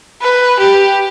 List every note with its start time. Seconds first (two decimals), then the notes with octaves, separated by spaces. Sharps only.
0.22 B4
0.59 G4